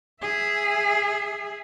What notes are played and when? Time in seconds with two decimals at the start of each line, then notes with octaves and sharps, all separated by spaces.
0.21 G#4 E5